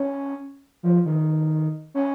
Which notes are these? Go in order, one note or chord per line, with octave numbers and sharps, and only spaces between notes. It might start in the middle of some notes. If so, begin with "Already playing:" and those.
Already playing: C#4
F3
D#3
C#4